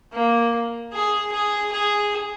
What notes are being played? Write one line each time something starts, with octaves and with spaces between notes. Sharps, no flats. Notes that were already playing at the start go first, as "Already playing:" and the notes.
A#3
G#4
G#4
G#4